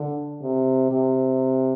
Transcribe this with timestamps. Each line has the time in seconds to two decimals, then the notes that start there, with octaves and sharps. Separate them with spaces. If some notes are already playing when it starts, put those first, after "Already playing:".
Already playing: D3
0.41 C3
0.91 C3